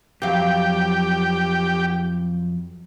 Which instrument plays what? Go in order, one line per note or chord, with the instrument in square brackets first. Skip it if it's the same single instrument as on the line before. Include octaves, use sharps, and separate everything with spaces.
[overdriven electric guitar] F2 [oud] F#3 F5 [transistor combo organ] G4